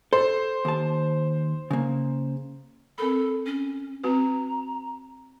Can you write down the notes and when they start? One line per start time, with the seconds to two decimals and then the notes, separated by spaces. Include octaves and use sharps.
0.13 A4 C5
0.65 D#2 A5
1.71 C#3 A#3
2.98 C4 A4 A#4 B5
3.46 C#4
4.04 C4 F#4 B4 A#5